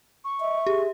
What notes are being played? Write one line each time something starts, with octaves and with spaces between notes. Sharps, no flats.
C#6
D#5 E5
G4 G#4